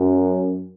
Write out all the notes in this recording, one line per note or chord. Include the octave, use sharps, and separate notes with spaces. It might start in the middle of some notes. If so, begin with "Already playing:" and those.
Already playing: F#2